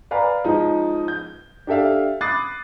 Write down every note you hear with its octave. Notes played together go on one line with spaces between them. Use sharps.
B4 D5 F5 G#5 A#5 B5
F3 G#3 D#4
G6
D4 G4 A4 E5 F5
B5 D6 D#6 F#6 A6 C7